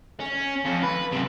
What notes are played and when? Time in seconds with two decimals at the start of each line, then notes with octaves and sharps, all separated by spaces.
0.20 C#4
0.65 F2
0.83 B4
1.12 F#2 C3